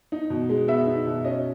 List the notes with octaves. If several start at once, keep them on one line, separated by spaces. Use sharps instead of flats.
D#4
B2
G#3
B3 E5
D#4
B2
C#4 D#5